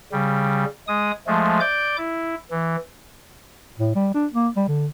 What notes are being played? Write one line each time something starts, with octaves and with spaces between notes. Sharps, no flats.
C#3 G3
G#3 D#6
F3 G#3 A3
D5 D6 G6
E4
E3
A2
G3
D4
A#3
G3
D3